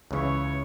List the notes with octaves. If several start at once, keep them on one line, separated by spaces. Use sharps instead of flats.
C#2 C#3 E3 C#5